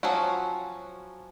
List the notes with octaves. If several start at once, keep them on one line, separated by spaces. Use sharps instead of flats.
F3 F#3 C#4 F#4